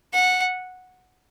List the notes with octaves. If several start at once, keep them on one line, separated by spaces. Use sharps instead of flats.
F#5